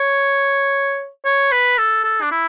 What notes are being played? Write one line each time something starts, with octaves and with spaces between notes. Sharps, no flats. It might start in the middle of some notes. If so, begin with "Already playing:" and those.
Already playing: C#5
C#5
B4
A4
A4
D4
E4